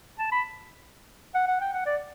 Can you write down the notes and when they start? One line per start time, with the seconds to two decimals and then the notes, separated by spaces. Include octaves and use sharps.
0.19 A5
0.32 B5
1.35 F#5
1.48 F#5
1.61 G5
1.73 F#5
1.86 D5